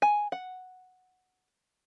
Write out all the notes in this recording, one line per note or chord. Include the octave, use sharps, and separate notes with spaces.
G#5
F#5